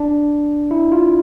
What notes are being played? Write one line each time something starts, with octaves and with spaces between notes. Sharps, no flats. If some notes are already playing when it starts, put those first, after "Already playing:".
Already playing: D4
E4
F4